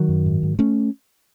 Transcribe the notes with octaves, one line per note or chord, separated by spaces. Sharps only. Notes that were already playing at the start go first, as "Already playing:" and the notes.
Already playing: D#3 F#3
F#2
G#2
G#2
A3 C#4